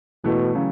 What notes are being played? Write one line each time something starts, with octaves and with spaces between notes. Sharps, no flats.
B2 E3 A3
C#3 F#3